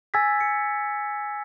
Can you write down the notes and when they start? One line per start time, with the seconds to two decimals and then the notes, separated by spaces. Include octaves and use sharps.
0.14 G#5 E6 G#6 A6 B6
0.41 C#7